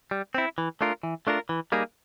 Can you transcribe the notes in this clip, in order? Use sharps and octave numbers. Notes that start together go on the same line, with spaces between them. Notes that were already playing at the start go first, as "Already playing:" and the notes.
G3
C4 E4
E3
A3 D4 F4 A#4
E3
A3 D4 F4 A#4
E3
G3 A#3 D#4 G#4